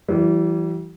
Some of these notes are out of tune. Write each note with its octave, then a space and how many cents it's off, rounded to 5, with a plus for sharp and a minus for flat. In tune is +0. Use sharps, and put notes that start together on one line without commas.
E3 +15 G3 -35